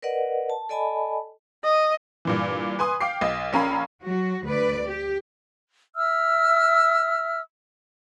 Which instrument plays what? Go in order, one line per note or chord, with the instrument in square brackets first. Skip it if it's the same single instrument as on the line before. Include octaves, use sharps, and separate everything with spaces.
[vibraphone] A#4 B4 D5 D#5 F#5
A5
A4 D5 D#5 G#5 A5 B5
[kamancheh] D#5
[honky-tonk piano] G2 A#2 E3
B4 G#5 C6 D#6
F5 G5 D6 C7
B1 D#5
A#1 C#4 A#4 F5 B5
[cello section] F#3 F#4
D2 B4 D5
G4
[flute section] E5 E6 F6